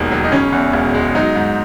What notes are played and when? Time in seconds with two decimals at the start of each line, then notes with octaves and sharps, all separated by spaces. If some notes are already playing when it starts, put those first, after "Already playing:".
Already playing: E1 D#2 D#3
0.11 F#3
0.24 D#4
0.32 C#3 C#4
0.52 E2
0.73 E1
0.94 G#3
1.15 F#3 D#4
1.35 G#2